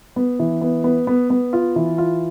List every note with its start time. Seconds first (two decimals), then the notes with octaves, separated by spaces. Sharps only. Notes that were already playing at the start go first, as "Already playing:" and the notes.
0.16 B3
0.39 E3
0.61 B3
0.84 B3
1.07 B3
1.30 B3
1.53 F4
1.76 E3
1.98 F4